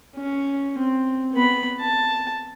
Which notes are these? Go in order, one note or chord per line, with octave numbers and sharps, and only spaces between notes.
C#4
C4
B3 B5
A5